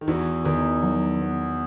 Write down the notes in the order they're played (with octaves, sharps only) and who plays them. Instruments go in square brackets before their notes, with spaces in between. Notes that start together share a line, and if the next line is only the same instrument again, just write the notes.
[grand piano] D#3
[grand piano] E2 E3 [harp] F#4
[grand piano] E2 E3 [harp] D#3
[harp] F#3
B3